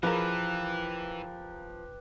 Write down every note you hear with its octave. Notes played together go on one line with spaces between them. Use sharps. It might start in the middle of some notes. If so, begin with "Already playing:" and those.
E3 F3 F4 G4 G#4 A#4 B4